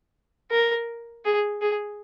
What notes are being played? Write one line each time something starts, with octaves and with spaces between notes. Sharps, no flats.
A#4
G#4
G#4